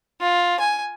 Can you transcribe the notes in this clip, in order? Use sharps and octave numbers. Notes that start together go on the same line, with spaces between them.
F4
G#5